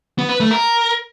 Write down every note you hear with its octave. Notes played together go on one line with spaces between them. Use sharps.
B3
B4
A3
A#4